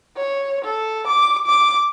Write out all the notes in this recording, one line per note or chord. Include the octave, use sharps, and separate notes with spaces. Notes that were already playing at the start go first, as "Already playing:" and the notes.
C#5
A4
D6
D6